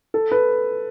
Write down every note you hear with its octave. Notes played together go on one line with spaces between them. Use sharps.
A4
B4